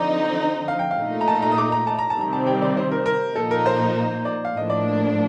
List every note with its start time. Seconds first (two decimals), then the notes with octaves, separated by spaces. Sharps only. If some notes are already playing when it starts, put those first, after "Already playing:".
Already playing: D3 F3 C4 D#4 D5
0.09 D#5
0.68 F5
0.79 G5
0.91 F5
0.98 A#2 A3 D#4
1.21 A#5
1.28 A5
1.42 A#5
1.52 D#6
1.58 D6
1.72 A#5
1.87 A5
1.99 A#5
2.10 A5
2.17 C3 D#3 G3 C4 A#5
2.33 A5
2.47 G5
2.62 D5
2.77 C5
2.91 A#4
3.06 A#4
3.35 A#2 F3 A#3 D#4 A4
3.51 A#4
3.66 C5
4.25 D5
4.45 F5
4.54 A2 F3 A#3 D4 D#5
4.70 D5